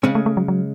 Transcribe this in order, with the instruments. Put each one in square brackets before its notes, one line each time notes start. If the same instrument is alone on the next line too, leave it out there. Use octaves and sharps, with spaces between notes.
[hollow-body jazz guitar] C#3 G#3 C#4 [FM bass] C4
[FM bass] A3
A3
F#3
F#3